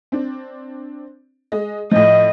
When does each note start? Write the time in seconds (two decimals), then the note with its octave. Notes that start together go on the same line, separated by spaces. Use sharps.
0.12 C4 D4
1.52 G#3 D#5
1.91 A2 F3 D#5